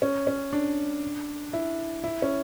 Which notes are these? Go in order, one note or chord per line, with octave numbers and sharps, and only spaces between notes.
C#4
C#4
D4
E4
E4
C#4